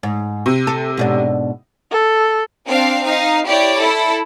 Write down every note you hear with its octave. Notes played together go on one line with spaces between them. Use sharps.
G#2
C3
A4
G#2 B2 D4
A4
C4 D4 F5
D#4 F5
E4 G4 C#5 D5
E4 A4